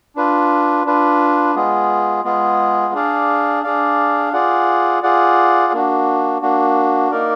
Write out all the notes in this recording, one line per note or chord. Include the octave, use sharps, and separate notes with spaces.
D4 F4 B4
D4 F4 B4
G#3 B3 F4 G#4
G#3 B3 F4 G#4
D4 G#4 D5 F5
D4 G#4 D5 F5
F4 G#4 D5 F#5
F4 G#4 D5 F#5
A#3 D4 F#4
A#3 D4 F#4
A#3 D#4 A#4 D5